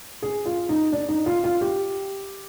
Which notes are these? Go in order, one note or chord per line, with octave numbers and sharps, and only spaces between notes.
G#4
F4
D#4
D4
D#4
F4
F4
G4